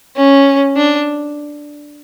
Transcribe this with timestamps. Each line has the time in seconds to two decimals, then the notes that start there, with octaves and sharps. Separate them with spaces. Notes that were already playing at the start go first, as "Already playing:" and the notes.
0.16 C#4
0.76 D4